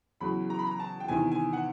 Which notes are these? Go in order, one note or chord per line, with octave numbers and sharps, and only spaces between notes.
E2 C#3 F#3 B5
A#5
B5
A#5
A5
G5
E2 C3 D#3 G#5
G#5
F#5